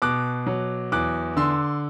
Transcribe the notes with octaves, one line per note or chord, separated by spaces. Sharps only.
B2 D6 F#6
F#3
E2 D6 F#6
D3 C6 E6